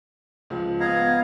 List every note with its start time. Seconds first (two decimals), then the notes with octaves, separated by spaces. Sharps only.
0.50 C#2 F3
0.80 B3 D#5 F5 A#5 G#6